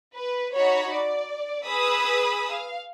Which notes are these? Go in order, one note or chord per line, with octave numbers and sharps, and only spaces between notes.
B4
D#4 F#4 C#5 B5
D5
G#4 B4 B5 D#6 E6
F5